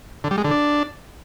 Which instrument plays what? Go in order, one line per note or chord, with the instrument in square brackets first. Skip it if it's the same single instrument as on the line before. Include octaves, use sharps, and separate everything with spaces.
[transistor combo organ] D3
G3
G#3
D3
D4